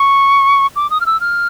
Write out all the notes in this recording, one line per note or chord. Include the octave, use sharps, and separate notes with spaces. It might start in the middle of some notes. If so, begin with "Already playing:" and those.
Already playing: C#6
D6
D#6
F6
E6
F6